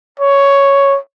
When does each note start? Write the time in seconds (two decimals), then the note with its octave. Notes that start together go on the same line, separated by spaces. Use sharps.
0.20 C#5